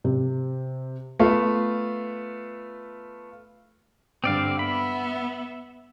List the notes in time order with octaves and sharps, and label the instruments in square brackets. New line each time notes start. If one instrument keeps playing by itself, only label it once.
[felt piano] C3
[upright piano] A3 B3 F4
[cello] G2 D3 [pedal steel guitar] C4 D5 F5
[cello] B3 E5 [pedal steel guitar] B5